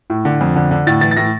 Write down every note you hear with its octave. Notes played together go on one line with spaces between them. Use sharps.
A2
D3
F2
D3
D3
A2 A6
E3 A6
A6
A2 A#6